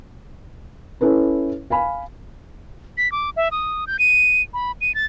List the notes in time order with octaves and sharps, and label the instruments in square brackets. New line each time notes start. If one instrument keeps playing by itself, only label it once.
[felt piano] C#4 E4 A4 B4
F5 G#5 B5
[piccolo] B6
D6
E5
D#6
G6
D#7
B5
D#7
A6